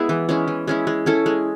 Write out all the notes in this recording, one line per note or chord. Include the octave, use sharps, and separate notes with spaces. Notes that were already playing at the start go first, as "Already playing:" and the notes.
Already playing: G#3 B3 E4 G#4
E3
G#3 C#4 E4
E3
G#3 C#4 E4
G#3
C#4 E4 A4
G#3